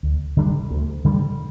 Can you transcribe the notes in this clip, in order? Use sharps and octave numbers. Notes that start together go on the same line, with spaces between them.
D2
D3 G3 D4
D2
D3 G3 D4